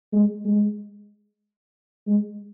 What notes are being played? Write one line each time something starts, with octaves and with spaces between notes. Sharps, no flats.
G#3
G#3
G#3